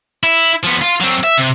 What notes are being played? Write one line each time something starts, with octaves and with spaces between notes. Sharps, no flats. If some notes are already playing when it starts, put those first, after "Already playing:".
E4
F3 B3
F4
F#3 C4
E5
C3